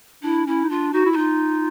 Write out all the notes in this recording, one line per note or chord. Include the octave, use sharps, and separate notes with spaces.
D4 E4
C#4 E4
D#4
D4 F4
D#4 F#4
E4
F#4
D#4 F4